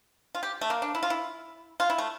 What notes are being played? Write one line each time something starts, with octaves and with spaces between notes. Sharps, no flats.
F4
G4
A3
A#3
D4
E4
F4
E4
F4
E4
A3